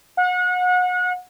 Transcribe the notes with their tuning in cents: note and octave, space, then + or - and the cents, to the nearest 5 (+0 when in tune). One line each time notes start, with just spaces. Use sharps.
F#5 -35